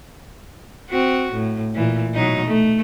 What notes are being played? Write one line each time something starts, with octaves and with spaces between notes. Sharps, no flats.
C4 F#4
A2
A#2 E3
B2 F#3 D#4
A3